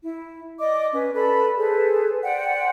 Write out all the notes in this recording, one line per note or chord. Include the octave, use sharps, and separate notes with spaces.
E4
D5 D#5 D6
C#4 B4
A4 B4 D5 B5
G#4 A4 B4 C5
C5 D5 F#5 G5